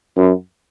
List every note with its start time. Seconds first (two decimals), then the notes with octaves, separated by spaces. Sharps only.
0.17 F#2